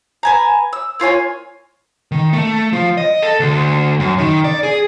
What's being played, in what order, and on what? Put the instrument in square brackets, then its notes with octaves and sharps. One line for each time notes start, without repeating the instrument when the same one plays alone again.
[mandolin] B4 G#5 A#5
E6
A#3 F4 C#5 G#5
[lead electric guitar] D#3
A3
F3
D#5
A4
D2
F#2
D#3
D5
G#4